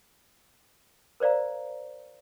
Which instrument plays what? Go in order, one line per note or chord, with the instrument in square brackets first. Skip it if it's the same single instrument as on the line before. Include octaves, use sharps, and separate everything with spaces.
[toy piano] A#4 C5 D5 F5 A#5